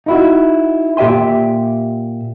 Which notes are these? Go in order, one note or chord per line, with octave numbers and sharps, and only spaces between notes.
D#4 E4 F#4
A#2 G4 E5 G#5 C6